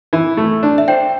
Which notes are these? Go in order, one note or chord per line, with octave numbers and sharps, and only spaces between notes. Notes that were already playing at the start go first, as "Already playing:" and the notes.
E3
A3
D4
E5
C5 G5